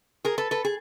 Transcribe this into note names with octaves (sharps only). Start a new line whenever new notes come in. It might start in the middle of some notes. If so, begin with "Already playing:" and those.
G#4 A#4
A4 B4
A4 B4
G#4